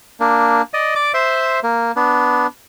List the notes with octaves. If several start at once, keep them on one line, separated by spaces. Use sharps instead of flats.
A#3 D4
D5 D#5
D5 D6
C5 E5 C6
A#3
B3 D4